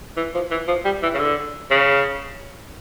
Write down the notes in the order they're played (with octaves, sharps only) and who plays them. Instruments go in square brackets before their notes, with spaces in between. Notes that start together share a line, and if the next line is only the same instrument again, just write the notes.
[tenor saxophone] E3
F3
E3
F3
G3
E3
C#3
D3
C#3